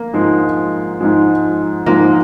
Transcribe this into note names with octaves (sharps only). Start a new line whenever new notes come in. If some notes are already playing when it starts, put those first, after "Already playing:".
Already playing: A#3
G#2 F3 G#3
G#2 F3 G#3
G#2 F3 G#3 A#3